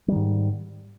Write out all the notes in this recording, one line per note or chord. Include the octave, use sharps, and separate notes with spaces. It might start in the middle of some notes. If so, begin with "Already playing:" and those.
G#2 D#3 G3